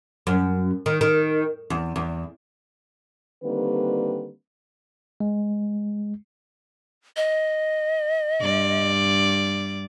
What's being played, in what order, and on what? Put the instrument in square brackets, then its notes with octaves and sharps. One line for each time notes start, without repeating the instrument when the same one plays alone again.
[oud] F#2
D#3
D#3
E2
E2
[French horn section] D3 D#3 G3 A#3 C4 B4
[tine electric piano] G#3
[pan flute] D#5
[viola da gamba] G2 D5